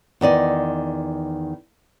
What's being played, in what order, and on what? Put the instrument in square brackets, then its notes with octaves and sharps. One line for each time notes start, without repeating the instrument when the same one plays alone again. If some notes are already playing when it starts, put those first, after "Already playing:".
[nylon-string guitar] E2 D#3 D5 D#5